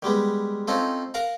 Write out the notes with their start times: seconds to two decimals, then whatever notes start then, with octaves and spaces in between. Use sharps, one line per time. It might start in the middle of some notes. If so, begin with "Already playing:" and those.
0.03 D#3 G3 G#3 B3
0.68 C4 C#4 D#4 F4 A4
1.14 A#4 F5 F#5 A#5